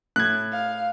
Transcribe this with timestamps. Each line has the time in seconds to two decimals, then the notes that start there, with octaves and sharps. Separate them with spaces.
0.16 A2 F#6 G#6
0.52 F5